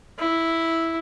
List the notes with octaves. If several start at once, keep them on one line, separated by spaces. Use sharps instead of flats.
E4